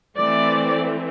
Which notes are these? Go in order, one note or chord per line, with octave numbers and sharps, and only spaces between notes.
E3 A3 C4 D5